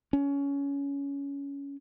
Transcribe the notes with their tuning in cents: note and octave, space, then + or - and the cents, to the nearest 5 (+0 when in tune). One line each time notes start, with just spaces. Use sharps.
C#4 +20